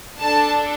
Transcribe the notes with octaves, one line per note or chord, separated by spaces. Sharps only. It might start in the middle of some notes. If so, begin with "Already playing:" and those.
D4 A4 A5